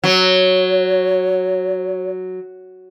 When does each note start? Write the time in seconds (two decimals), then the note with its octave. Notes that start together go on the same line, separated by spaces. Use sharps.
0.04 F#3 C#5